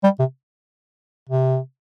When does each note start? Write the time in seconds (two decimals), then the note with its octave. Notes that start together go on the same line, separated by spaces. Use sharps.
0.04 G3
0.19 C3
1.29 C3